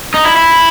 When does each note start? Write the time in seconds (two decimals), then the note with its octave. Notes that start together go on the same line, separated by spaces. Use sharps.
0.14 D#4
0.25 E4
0.36 E4